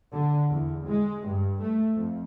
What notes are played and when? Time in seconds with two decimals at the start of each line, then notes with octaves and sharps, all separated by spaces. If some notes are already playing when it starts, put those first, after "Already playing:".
0.13 D3
0.49 E2
0.86 G#3
1.26 G2
1.61 A3
1.94 F2